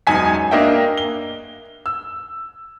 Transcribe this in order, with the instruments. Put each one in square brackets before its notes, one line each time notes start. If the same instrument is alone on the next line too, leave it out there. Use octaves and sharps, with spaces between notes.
[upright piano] E1 F#2 D#4 G#5 B6
A#3 D4 A#4 D#5 E5 G5
G7
E6